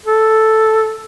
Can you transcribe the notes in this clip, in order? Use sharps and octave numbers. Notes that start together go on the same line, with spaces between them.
A4